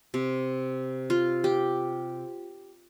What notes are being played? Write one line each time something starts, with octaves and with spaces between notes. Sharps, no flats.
C3
F4
G4